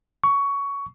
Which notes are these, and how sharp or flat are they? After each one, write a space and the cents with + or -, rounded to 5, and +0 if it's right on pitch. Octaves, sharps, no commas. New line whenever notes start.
C#6 +15